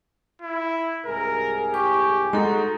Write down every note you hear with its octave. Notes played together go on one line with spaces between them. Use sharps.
E4
C2 G#2 G#4 A#4
G4 C#6 D6
G#3 D#4 F#4 A4 A#5